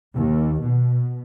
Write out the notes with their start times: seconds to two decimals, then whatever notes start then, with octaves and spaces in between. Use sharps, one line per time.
0.14 D#2
0.61 B2